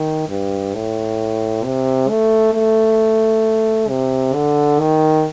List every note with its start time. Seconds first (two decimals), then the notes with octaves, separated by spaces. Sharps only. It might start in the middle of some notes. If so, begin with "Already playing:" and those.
Already playing: D#3
0.29 G2
0.74 A2
1.64 C3
2.10 A3
2.54 A3
3.89 C3
4.34 D3
4.79 D#3